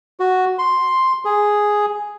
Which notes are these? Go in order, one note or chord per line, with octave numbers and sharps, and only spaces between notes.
F#4
C6
G#4